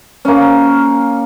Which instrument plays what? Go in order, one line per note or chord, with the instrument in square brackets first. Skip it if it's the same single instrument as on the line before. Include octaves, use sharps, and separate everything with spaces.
[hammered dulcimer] A#3 C#4